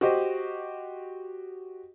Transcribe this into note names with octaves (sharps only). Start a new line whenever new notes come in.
F#4 G4 C5 D#5